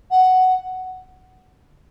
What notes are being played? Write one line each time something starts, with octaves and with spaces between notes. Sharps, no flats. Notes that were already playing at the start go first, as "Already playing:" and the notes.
F#5